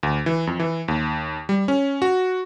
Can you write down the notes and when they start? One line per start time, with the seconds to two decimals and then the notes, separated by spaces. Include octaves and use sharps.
0.03 D2
0.26 E3
0.47 F2
0.60 E3
0.88 D#2
1.49 G3
1.68 C#4
2.02 F#4